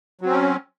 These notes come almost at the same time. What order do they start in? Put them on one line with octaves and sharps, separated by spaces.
F#3 C4 C#4